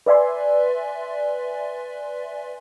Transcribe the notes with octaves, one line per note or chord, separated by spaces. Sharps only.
B4 D5 E5 G#5 C6